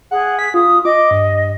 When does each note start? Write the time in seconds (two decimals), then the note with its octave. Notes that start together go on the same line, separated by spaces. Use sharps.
0.11 G#4 F#5
0.39 B6
0.54 F4 D#6
0.85 D#5 D6
1.11 G2